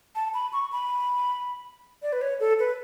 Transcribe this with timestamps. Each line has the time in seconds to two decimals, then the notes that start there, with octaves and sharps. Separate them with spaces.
0.15 A5
0.34 B5
0.53 C#6
0.72 B5
2.02 D5
2.13 B4
2.21 C#5
2.40 A4
2.59 B4